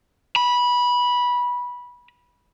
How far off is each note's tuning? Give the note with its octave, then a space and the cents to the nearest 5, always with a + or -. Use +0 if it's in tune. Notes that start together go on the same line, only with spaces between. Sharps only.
B5 -15